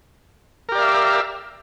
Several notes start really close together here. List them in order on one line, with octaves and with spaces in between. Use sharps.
A#4 G4 D5 F5 E5